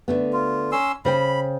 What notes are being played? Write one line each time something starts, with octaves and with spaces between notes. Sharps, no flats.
D3 A3 B3
F4
C#4 C6 E6
C#3 C5 G5 B5